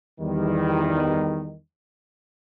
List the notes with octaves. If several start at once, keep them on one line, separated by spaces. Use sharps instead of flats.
E2 D#3 G3